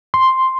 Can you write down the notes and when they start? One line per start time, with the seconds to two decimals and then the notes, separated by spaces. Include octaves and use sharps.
0.14 C6